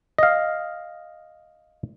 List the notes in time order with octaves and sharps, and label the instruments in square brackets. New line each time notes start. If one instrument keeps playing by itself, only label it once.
[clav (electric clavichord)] D#5 F5